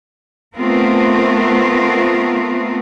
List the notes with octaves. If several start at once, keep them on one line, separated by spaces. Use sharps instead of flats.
A3 B3 C4 F4 A#4